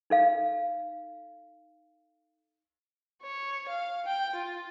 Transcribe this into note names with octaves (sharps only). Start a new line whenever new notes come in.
D#4 A4 F5
C#5
F5
G5
F4